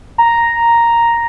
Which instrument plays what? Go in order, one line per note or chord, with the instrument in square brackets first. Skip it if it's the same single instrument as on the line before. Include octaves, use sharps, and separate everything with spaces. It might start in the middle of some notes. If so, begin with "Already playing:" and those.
[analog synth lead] A#5